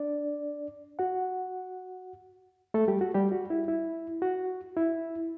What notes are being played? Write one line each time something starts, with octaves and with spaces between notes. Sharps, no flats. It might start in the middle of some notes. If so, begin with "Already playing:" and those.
Already playing: D4 D5
F#4 F#5
A3 A4
G3 G4
F#4
G3 G4
F#4
E4
E4
F#4
E4